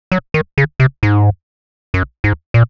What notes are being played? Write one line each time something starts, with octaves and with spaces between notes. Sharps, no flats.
F#3
D#3
C#3
C3
G#2
F#2
G#2
A#2